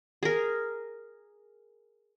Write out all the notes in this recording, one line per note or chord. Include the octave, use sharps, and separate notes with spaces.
G#4 A#4